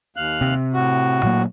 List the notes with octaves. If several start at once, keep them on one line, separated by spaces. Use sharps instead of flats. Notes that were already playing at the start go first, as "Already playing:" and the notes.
D#2 F5 F#6
C3
A2 F#4
A#2 F#3 A#3